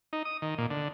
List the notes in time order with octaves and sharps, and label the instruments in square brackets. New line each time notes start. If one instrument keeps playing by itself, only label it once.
[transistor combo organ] D#4
D#6
D#3
A#2
D3